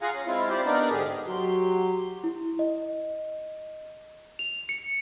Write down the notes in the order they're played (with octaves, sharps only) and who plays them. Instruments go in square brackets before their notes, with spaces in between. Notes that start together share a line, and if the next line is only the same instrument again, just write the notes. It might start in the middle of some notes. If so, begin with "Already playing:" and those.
[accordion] F4 G#4 F5 F#5 G#5 A#5
C#4
G#3 C4 E4 F4
G4 C5 D5
B3 D4 D#4 A#4 D5
G#2 D3 G4 G#4
[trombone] F#3 [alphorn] F#4 [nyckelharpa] G4 C6
[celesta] E4
D#5
F7
C#7